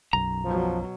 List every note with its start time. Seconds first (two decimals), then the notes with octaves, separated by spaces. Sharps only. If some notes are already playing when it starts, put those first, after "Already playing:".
0.13 B1 F#2 A#5
0.45 B2 F3 F#3